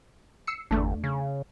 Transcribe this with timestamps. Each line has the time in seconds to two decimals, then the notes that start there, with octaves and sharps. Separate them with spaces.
0.47 E6 C7 C#7
0.71 G1 E2 A3 D4
1.04 C#3